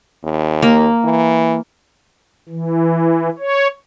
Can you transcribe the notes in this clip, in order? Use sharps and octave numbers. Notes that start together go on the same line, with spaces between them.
D#2
A#3
E3
E3
C#5